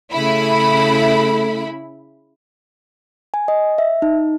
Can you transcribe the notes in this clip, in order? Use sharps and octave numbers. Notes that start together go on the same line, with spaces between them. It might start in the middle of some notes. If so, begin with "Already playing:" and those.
C#3 A3 E4 B5
G#5
D#5
E5
D#4